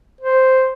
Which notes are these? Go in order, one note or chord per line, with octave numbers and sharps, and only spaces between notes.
C5